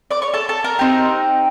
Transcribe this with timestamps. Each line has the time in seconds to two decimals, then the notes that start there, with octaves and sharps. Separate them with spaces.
0.11 D5 D6
0.22 C#5 C#6
0.33 A4 A5
0.49 A4 A5
0.64 A#4 A#5
0.79 C4 D#4 G4